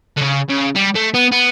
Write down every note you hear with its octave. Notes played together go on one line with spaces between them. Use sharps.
D3
C#3
C#3
G3
A3
B3
B3